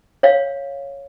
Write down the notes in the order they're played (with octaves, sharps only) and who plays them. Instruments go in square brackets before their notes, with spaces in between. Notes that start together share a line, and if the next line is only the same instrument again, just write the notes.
[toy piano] C#5 F5